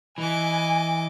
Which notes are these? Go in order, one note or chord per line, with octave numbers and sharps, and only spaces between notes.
E3 D#5 G#5 D6